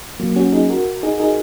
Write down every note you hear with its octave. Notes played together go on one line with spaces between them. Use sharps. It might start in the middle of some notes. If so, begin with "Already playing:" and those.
F#3 A#3
C#4 F#4
D#4 G#4
F#4 A#4
D#4 G#4
D#4 G#4